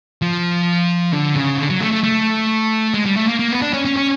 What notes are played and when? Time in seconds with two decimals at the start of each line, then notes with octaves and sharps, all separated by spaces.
0.22 F3
1.13 D3
1.36 C#3
1.57 D3
1.70 F#3
1.81 A3
1.92 A3
2.04 A3
2.94 G#3
3.06 G3
3.16 A3
3.28 A#3
3.39 A#3
3.51 B3
3.62 D4
3.73 C#4
3.85 C#4
3.96 C#4